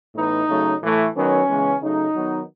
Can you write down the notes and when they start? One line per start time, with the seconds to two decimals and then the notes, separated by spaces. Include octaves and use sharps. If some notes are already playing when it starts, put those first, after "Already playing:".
0.15 A2 E3 B3 D#4
0.49 C#3 F#3 A3
0.82 A2 E3 A3
1.15 D#3 F#3 B3 C#4
1.49 C#3 E3 G#3 B3
1.81 C#3 F#3 A3 D#4
2.15 D#3 F#3 B3